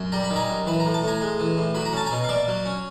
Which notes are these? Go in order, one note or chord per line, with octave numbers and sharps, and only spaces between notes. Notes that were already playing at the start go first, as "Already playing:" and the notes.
Already playing: F#2
G3 A#5
B5
D#3
G#5 A#5
F#2
E3 B5
A#5
A2
A5
A2 G#5 A#5
G#3
E3
A2
F#3 B5
A#5
C#4 A5
G#5 A#5
B2
F5
A#3 D5 E5
F#3
C#4